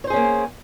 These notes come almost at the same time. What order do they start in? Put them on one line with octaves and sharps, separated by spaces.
C#5 C5 G#4 C#4 A#3